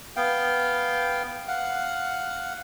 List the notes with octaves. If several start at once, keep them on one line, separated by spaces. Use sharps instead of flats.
B3 F5 G5
F5 F#5